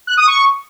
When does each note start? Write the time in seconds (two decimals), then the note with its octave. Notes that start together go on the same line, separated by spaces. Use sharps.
0.07 F#6
0.17 D#6
0.27 C#6